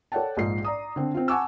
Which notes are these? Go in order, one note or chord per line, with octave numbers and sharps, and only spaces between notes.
A4 C#5 D5 F#5 G5 A5
A#1 G#2 F4 C7
D5 A#5 D#6
D3 C4
C4 F4
F#5 G#5 A5 C#6 D6 E6